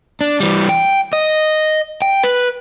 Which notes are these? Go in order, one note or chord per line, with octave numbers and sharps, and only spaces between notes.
D4
E3 G3
G5
D#5
G5
B4